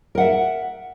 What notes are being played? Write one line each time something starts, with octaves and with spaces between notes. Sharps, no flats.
A#4 E5 F#5